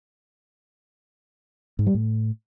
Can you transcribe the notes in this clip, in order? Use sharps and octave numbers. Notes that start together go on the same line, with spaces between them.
G#2
G3
A2